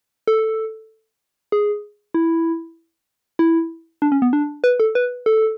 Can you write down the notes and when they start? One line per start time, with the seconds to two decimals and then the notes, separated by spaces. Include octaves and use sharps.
0.28 A4
1.52 G#4
2.14 E4
3.39 E4
4.02 D4
4.12 C#4
4.22 B3
4.33 D4
4.64 B4
4.80 A4
4.95 B4
5.26 A4